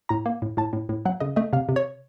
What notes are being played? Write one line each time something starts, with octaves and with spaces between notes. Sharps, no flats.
A2 A#5
A#3
A2
A2 A5
A2
A2
F#3 F#5
C#3 D#5
A3 D#5
C3 F5
C3
C#5